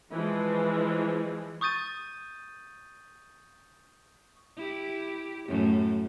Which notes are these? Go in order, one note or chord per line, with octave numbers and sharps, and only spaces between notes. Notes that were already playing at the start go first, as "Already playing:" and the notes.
E3 F3 G#3
C#6 D#6 G6 A6 D#7
E4 G4
F#2 A2 A3